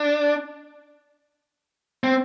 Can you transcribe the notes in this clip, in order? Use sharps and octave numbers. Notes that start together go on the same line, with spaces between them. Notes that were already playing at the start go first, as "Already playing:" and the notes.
Already playing: D4
C4